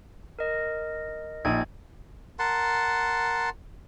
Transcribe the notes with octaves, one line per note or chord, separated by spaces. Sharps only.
A#4 D#5
A#1 D#4 G#6 D#7
A#4 F#5 A5 C6